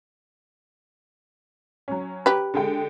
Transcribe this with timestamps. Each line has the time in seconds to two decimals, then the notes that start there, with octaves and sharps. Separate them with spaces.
1.88 F#3 C#4
2.26 G4 B4
2.54 D3 G#3 G5